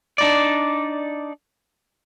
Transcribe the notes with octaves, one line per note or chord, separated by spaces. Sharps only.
D4 D#4 D5